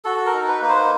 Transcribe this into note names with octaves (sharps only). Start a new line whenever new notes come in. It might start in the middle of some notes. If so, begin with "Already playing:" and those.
F#4 A4
A#4
D#4
B4
A#3 B4
C5